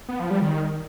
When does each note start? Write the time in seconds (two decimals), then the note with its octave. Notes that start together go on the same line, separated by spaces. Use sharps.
0.08 B3
0.19 F3
0.30 G3
0.41 D#3